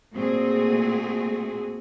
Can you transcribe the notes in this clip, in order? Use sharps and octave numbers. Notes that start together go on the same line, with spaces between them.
A#2 A3 C4 F#4 G#4